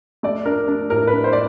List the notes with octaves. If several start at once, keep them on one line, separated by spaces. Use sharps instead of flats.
A3 D5
D4 A#4
D4
A2 A#4
B4
D4
C5
D5